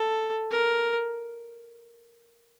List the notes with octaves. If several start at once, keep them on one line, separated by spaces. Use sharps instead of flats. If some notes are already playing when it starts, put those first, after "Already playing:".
Already playing: A4
A#4